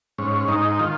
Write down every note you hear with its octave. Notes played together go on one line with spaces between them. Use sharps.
G#2 C#4
G#2 D#4
D#3 F4